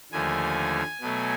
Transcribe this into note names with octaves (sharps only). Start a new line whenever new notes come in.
D#2 D3 F3 A3 G#5
B2 F#3 A3